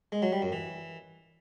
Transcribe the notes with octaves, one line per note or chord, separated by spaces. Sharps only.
G#3
F#3
G3
F#2
E3